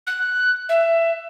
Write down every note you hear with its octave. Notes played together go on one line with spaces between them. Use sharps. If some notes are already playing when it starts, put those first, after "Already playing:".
F#6
E5